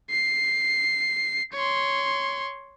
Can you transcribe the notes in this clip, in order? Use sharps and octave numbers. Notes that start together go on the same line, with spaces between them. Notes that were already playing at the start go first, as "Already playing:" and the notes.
C7
C#5 C6